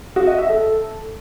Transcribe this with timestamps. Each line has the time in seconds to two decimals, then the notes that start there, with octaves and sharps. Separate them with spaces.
0.16 F#4
0.27 D#5
0.38 E5
0.49 A4